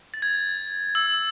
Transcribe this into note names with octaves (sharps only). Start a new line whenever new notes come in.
A6
G#6
E6